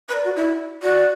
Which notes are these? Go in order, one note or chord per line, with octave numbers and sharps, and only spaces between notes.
B4
A#4 D5
F#4
E4
F#4 D5